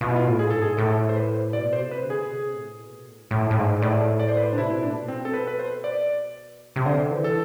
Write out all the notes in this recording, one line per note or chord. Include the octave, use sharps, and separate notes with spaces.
B2 F4
E4
F4
A2
G#4
G#2 A4
G#4
A2 A4
C5
B4
B2 D5
C5
C3
B4
D3
G#4
B2
C3
A2
B2
A2
G#2
A2
A2
G#2
A2 D5
D5
C5
B4
C5
D4
C3 E4
B2
A2 D4
B2
C4
A4
B4
B4
C5
D5
C3
D3 C5
E3
A4